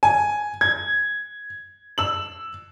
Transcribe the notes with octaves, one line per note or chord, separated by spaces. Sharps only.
G#5
G#6
E6 F#7